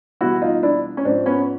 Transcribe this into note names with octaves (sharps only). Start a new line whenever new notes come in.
E2 B2 G3 E4 F#4
D#4 F4
D4 E4
C#4
G#2 F3 C4 D4
B3 C#4